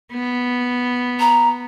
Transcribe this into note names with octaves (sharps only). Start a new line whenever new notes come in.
B3
A#5